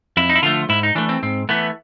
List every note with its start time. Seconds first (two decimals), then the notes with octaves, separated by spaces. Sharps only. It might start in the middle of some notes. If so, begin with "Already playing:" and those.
0.17 F2 E4
0.29 D#4
0.35 E4
0.42 D3 F3 A3 F4
0.69 G#2 E4
0.83 D#4
0.95 E3 A3 D4
1.09 C4
1.23 G#2 C4
1.49 E3 A3 B3